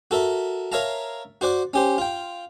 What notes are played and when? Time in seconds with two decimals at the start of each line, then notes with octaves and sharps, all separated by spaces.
0.11 F#4 A4 A#4 E5
0.72 A#4 C#5 E5 F5 A5 A#5
1.41 F#4 C5 D5 F#5
1.74 C#4 G4 C5
1.98 F4 G5